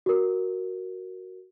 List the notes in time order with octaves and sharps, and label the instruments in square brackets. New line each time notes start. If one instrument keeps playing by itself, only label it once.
[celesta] F#4 A#4